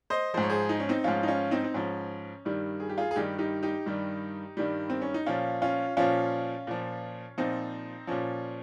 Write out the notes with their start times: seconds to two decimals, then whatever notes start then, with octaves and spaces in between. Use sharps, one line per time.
0.10 C5 D#5
0.34 F3 C5
0.38 G#2
0.43 C#5
0.50 G#4 C5
0.69 D#4
0.80 C#4
0.89 C4 D#4
1.04 G#2 F3 C#4 F4
1.23 D#4
1.27 C#4 F4
1.51 C4 D#4
1.64 C4
1.74 G#2 F3 C#4
2.45 G2 D#3 G3
2.80 G#4
2.89 G4
2.98 F4 G#4
3.11 G#4
3.16 G2 D#3 G3 D#4 G4
3.38 D#4 G4
3.63 D#4 G4
3.86 G2 D#3 G3
4.57 G2 D#3 G3
4.90 C4
5.02 C#4
5.14 D#4
5.26 A#2 F3 C#4 F4
5.62 C#4 F4
5.97 A#2 F3 C#4 F4
6.67 A#2 F3
7.38 A#2 F3 C4 D#4
8.07 A#2 F3 C#4